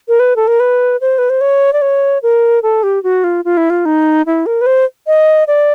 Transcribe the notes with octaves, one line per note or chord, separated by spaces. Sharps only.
A#4
B4
A4
A#4
B4
C5
B4
C5
C#5
D5
C#5
A#4
A4
G4
F#4
F4
F4
E4
F4
D#4
E4
A#4
B4
C5
D#5
D5